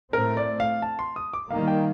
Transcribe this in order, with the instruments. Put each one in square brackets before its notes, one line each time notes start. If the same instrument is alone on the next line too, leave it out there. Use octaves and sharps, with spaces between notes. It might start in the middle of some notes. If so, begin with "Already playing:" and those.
[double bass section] A2 A3 C4 [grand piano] A#4
[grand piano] D5
F5
A5
C6
D#6
D6
[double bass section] D#3 G3 A#3 [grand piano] F5
[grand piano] G5